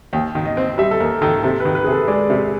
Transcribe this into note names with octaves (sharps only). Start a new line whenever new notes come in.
D#2 G5
D#3
D#5
C4
G3 E5
A4
D#2 A#4
D#3 A4
C3 A4
B4
D#3
B4
C3 G#4
A4
G#3 D5
C3